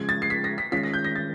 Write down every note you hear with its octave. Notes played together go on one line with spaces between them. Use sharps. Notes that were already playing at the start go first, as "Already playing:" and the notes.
Already playing: C#3 F3 G#3 G#6
A6
C7
B6
A#6
B6
D#3 G#3 C#4 F4 B6
A#6
G6
A#6
A6